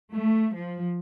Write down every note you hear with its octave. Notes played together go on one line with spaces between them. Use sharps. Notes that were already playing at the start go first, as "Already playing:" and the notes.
A3
F3